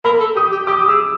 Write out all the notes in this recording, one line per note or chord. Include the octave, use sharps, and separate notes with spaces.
A#4 B5
A4
G4 D#6
G4
G4 D6
D#6
G#4 E6